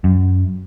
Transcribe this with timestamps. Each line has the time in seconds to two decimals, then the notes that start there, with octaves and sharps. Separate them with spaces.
0.04 F#2